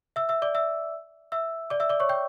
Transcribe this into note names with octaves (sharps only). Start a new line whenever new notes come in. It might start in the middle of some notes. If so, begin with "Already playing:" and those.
E5 E6
E5 E6
D5 D6
E5 E6
E5 E6
D5 D6
E5 E6
D5 D6
C#5 C#6
G5 G6